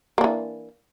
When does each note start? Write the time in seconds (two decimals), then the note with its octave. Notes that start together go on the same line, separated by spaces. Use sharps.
0.18 A#3
0.21 D4
0.24 E3